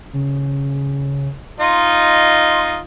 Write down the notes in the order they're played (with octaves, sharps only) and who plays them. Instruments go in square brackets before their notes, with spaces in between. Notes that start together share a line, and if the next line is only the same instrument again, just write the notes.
[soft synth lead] C#3
[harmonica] D#4 F4 D#5 [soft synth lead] C6